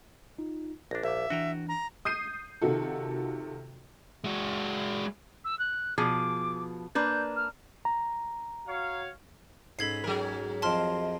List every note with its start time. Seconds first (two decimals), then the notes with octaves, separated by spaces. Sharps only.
0.38 D#4 F4
0.91 A#1 D4 A#6
1.03 A#1 E5 F5 D6
1.30 E3 D4 F#4 G5 A#5
1.69 A#5
2.05 D#6 G6 C7 D#7
2.62 C3 D#3 F4 F#4 A4
4.24 G#3 F#4
5.45 E6
5.59 F#6
5.98 B2 F3 G#4 D6
6.95 A#3 D4 B4 G6
7.36 F6
7.85 A#5
8.67 F#4 C#5 F5
9.79 G#2 C#4 A4 B5 G#6 C7
10.04 F#3 G#4 A#4
10.62 F2 F3 C4 D#5 A5 C6 F6